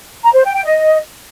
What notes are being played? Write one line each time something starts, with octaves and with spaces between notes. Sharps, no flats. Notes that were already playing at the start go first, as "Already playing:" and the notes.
A#5
C5
G5
G5
D#5